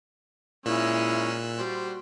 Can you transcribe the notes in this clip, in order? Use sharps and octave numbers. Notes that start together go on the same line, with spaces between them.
A#2 G#3 C#4 D#4 E4 E6 F#6
G3 F#4 C5